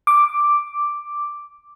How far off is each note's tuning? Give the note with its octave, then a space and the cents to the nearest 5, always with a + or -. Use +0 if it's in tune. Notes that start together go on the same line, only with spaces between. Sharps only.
D6 +0